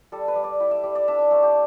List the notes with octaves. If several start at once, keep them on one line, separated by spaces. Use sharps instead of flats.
G3 A4
B4
G3
D5
E4 G5
E5
G3 D5
D5
D4 E5
E5
A3 A4
G4